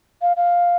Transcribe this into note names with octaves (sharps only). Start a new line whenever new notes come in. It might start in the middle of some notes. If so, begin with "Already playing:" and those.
F5
F5